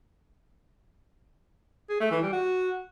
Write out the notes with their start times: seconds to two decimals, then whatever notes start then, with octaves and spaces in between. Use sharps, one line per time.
1.89 G#4
2.00 A3
2.11 E3
2.22 G3
2.33 F#4